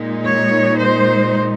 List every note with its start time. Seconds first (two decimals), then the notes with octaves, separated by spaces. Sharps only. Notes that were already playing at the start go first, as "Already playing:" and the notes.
Already playing: A#2 G#3 D#4
0.24 C#5
0.79 C5